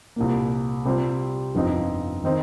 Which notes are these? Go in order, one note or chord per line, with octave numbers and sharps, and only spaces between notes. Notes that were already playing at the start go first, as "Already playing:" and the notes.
C2 A#2 A#3
C3 G3 C4 F4 C5
G1 F2 F3 C4 D#4
D#3 C4 D#4 C5